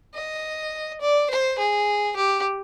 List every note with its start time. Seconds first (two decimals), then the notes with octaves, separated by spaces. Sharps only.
0.15 D#5
1.01 D5
1.30 C5
1.59 G#4
2.16 G4